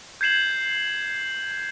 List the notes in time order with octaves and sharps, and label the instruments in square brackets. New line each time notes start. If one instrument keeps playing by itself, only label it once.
[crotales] G6 G#6 C7 E7 F#7